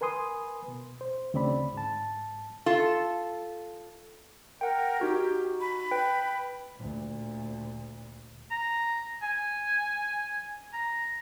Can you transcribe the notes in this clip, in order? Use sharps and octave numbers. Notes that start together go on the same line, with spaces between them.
A#4 B4 G#5 C6 D#6
B2
C5
D2 C#3 C4 D5 B5
G#2 A5
F4 A4
A#4 F#5 G5
D#4 F#4 G4
B5
B4 G5
D2 A#2
A#5
G#5
A#5